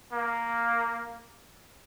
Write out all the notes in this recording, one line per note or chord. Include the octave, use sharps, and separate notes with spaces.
A#3